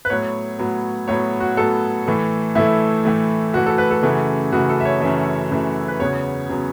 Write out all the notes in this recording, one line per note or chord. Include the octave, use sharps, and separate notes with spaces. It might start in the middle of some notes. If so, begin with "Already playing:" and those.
B4
A2 F#3 B3 C#5
A2 F#3 B3
A2 F#3 B3 C#5
F#4
A2 F#3 B3 A4
A2 E3 A3
A2 E3 A3 E4
A2 E3 A3
A2 E3 A3 F#4
A4
B4
A4
F#2 C#3 E3 A3 F#4
F#2 C#3 E3 A3 F#4
A4
E5
C#5
F#2 C#3 E3 A3 E5
F#2 C#3 E3 A3
B4
E2 C#3 F#3 B3 C#5
C#3 F#3 B3